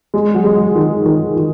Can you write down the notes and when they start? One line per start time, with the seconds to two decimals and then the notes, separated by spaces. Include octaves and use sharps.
0.14 G#3
0.34 F#3
0.44 G#3
0.75 D#3
1.06 D#3
1.37 D#3